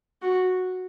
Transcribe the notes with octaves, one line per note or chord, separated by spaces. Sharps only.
F#4